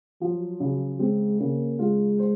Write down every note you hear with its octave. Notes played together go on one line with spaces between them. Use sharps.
F3 F#3
C#3
G#3 C4
C#3 A#3
G#3 F4
C5